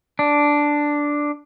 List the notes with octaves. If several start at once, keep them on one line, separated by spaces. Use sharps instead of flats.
D4